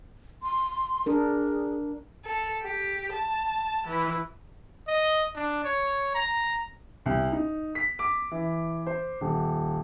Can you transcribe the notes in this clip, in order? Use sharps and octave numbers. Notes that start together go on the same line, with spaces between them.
C6
D4 G#4 A#4
A4
G4
A5
E3
D#5
D4
C#5
A#5
C2
D#4
B6
D6
E3
C5
D#1